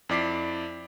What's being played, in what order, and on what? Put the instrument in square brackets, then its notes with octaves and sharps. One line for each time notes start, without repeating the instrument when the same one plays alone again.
[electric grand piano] F2 E4 D5 D6 B6 C7